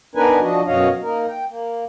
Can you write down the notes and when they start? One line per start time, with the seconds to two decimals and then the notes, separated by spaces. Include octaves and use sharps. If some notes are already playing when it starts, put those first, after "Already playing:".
0.15 B3 D4 D#4 A#4 B4 G#5
0.40 F3 D4 F#4 D#5
0.66 F#2 B2 F#4 C#5 D#5 F5
1.02 A#3 D#4 A#4
1.28 G5
1.49 A#3